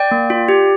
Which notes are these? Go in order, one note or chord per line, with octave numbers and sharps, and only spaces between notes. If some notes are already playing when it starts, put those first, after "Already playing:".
Already playing: D5 G5
A#3
F4
G4